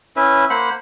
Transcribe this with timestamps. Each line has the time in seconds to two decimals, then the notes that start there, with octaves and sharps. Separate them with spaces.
0.16 C#4 E4 B4 E5
0.50 A#3 C5 F#5 B5